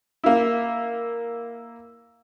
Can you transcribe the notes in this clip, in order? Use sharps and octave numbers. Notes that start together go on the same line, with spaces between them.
A#3 E4